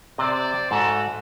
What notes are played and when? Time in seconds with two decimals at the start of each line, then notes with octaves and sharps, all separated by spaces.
0.18 C3 C5 D5
0.71 G#2 A3 F#4 A4